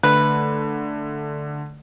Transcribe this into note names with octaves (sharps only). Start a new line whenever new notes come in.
D3 A3 B4